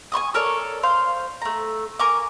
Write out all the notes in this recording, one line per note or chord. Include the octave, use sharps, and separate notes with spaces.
G#5 C6 C#6 D#6
A4 A#4 C#5 D5
C5 F5 C6
A3 A#5
A#4 G#5 C#6 D6